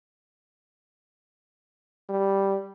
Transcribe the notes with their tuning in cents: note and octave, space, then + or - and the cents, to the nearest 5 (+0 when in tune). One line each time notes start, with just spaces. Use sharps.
G3 -5